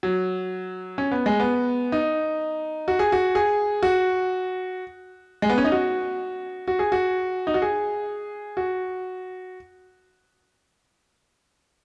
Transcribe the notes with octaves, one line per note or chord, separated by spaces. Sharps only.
F#3
C#4
B3
G#3
B3
D#4
F#4
G#4
F#4
G#4
F#4
G#3
B3
C#4
D#4
F#4
F#4
G#4
F#4
D#4
F#4
G#4
F#4